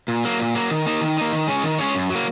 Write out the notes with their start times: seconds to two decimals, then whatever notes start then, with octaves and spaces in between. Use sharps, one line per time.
0.08 A#2
0.24 F#3 A#3
0.39 A#2
0.54 F#3 A#3
0.71 D#3
0.86 A#3 D#4
1.01 D#3
1.17 A#3 D#4
1.33 D#3
1.48 G#3 C#4 G#4 C#5
1.64 D#3
1.79 G#3 C#4 G#4 C#5
1.95 F#2
2.10 F#3 A#3